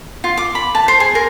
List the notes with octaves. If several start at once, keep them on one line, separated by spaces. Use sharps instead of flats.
F4
D6
B5
A5
C5
G#4
A#4